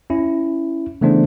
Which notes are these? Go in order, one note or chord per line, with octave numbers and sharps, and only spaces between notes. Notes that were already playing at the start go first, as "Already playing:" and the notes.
C#4 E4
C#3 E3 A3 B3 D4 C5